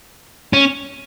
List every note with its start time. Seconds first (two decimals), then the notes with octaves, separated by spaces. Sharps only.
0.53 C#4